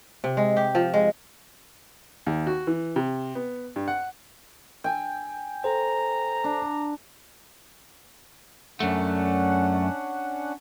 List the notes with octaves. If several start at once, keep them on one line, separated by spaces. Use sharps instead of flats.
C3
G#3
G4
F3
G#3
D#2
F#4
E3
C3
B3
G2
F#5
G5 G#5
A4 C5 A#5
D4
F#2 A3 C#4 D4 F#5